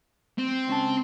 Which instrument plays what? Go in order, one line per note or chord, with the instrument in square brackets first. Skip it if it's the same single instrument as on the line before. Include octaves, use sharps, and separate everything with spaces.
[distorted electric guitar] C4
[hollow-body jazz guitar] C#2 C#4 A5